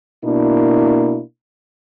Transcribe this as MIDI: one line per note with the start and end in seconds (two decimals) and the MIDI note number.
0.25 1.20 47
0.25 1.20 58
0.25 1.20 62
0.25 1.20 64